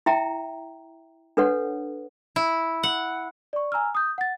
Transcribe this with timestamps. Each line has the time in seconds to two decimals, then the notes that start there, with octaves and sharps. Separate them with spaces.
0.06 E4 E5 G5 A#5
1.37 D4 A4 B4 C#5 F#5
2.36 E4
2.83 F#5
3.53 D5 C#6
3.72 G#5 A#5 E6 F6
3.95 D#6 G6
4.18 F#5 A6